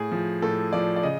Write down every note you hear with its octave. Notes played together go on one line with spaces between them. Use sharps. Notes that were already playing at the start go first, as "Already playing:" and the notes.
Already playing: A2 G#4
F3
A2 A4
F3 D5
D5
C#3 D#5